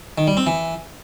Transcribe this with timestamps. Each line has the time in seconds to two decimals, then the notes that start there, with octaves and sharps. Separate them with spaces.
0.18 D#3
0.27 G3
0.37 C4
0.47 E3